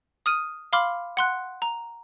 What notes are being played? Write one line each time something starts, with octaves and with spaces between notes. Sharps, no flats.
D#6 F6 D#7
F5 B5 C6 D6 F6
F#5 C6 F#6
A#5